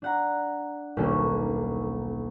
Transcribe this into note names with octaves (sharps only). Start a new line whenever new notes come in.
D4 F#5 A#5
D#1 B1 A#3 C#4 F#4 A4